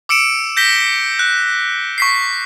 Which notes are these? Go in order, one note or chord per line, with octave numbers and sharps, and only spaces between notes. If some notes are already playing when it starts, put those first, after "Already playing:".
D6 E6 C#7 D7 E7
G6 A#6 B6 G7
F#6
C#6 B6 C7